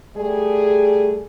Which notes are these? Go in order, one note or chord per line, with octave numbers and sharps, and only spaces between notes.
G3 A3 G#4